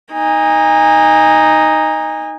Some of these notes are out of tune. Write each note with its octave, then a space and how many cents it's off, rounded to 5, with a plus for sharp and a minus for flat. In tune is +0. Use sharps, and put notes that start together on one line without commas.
D#4 +0 G#5 -30